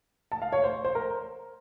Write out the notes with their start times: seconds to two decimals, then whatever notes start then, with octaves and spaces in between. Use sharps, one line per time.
0.32 A5
0.42 F5
0.52 C#5
0.64 C5
0.85 C5
0.95 A#4